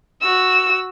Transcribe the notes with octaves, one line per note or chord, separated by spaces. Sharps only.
F#4 E6